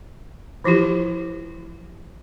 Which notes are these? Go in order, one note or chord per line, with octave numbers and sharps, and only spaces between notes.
E3 F3 E4 F4 G4